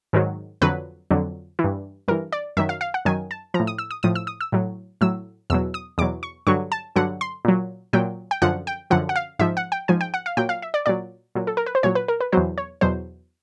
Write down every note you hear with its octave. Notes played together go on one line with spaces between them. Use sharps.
G#2 D#3 F#3
F2 D3 F#3 B4
F2 D3 F#3
E3
G2
G2 E3 A#4
D5
F#2 D#3 F#3 E5
F5
F5
F#5
F#2 D#3 F#3 G#5
A5
F3 A#5
A2
D#6
E6
D#6
A2 F3 D#6
E6
D#6
E6
A2 F#3
A2 F#3 E6
E2 B2 F#3 E6
D#6
E2 B2 F#3 D6
C#6
G2 D3 F#3 C#6
A5
G2 D3 F#3 F#5
C6
A#2 F#3
A#2 F#3 G5
G5
F#2 D3 F3 F#5
G5
F#2 D3 F3 F#5
F#5
F5
G#2 F3 E5
F#5
G5
G#2 F3 G#5
G5
F#5
F5
A#2 F#3 G5
F5
E5
D5
A#2 F#3 D5
A#2 F#3
A4
A#4
B4
C5
A#2 F#3 C#5
B4
A#4
B4
E2 B2 F#3 C5
C#5
E2 B2 F#3 C5